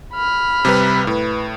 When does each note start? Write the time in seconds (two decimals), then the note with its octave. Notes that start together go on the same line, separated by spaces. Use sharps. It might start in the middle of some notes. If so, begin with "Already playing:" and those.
0.13 B5 F6
0.65 C3 G3 B4
1.07 A2 B4